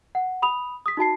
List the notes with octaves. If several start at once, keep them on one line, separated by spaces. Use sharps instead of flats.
F#5
B5 D#6 F7
D#6 B6
D#4 F#4 A5 C7